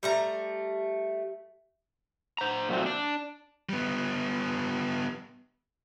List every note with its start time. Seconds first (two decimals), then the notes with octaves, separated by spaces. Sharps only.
0.03 G3 A3 A#5
2.38 C5 A#5
2.69 A#2 F#3 A3 C4
2.86 D4
3.69 G3 B3